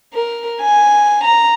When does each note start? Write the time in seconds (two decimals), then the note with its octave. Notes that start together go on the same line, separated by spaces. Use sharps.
0.13 A#4
0.61 G#5
1.24 A#5